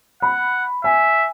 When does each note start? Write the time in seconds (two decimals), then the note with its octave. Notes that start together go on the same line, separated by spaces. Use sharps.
0.22 F#5 B5
0.84 E5 G#5